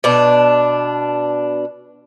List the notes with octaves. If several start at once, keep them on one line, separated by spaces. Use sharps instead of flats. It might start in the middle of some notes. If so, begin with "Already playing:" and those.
B2 D4